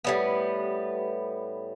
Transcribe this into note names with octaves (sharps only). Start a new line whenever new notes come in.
A2 G3 B3